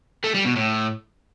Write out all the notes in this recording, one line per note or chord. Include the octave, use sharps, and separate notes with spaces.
A3
G3
B2
A2